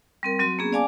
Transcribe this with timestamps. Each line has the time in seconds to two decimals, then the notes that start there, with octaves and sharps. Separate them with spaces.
0.23 G3 C4 A#4
0.39 F#3 C4 F#4 C6
0.59 A#3 B3 C#4 G#4
0.73 D5 F5 G#5 A5 D6